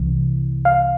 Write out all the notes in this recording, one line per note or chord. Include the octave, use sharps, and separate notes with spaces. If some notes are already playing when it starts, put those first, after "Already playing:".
Already playing: C2 C3 E3
F5